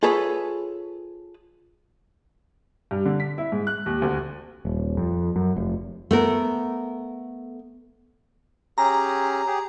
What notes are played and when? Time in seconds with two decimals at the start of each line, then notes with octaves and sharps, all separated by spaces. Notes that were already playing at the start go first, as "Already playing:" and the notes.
0.03 F4 G#4 A4 B4 C#5
2.91 G2
3.05 D3
3.20 B6
3.38 E4
3.52 G#2
3.67 F#6
3.86 D#2
4.02 D2
4.65 D#1
4.97 F2
5.36 F#2
5.56 F1
6.11 A3 B3 A#4
8.78 C#4 G4 G#4 A#5
9.47 G4 G#4